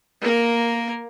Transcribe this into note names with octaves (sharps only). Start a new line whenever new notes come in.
A#3 A#4